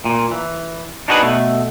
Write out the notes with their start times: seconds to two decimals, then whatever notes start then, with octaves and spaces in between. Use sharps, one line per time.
0.05 A#2
0.31 E3
1.08 D4 D#4 F#4 G#4 A#4 B4
1.21 B2 A3